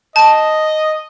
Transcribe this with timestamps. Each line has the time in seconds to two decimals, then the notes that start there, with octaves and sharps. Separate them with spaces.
0.16 D#5 A5